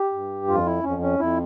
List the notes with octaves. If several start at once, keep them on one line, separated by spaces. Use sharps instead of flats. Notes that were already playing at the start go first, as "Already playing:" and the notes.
Already playing: G4
G2
F2 F4
E4
F2 C#4
C#4
F2 E4